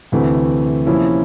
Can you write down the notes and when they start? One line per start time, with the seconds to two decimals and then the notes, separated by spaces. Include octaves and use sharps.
0.12 D2 C3 E3 A3 C4
0.87 C3 F3 A#3 C#4 E4